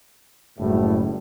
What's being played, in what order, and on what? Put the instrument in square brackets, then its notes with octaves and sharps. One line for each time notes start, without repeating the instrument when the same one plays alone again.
[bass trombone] F#1 [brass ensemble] A2 G3